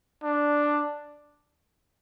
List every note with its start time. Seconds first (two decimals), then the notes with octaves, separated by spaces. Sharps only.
0.24 D4